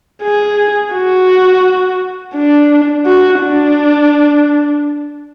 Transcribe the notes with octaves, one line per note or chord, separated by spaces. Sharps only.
G#4
F#4
D4
F#4
D4